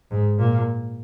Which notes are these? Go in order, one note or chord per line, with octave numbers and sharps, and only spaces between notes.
G#2
A#2